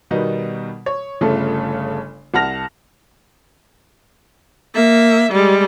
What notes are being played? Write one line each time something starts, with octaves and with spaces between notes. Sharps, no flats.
B2 D#3 G3 B3 D#4
C#5
G1 C#3 A3 F4 A4
C2 F#5 A5 F6 A#6 F7
A#3 E5
G3 G#3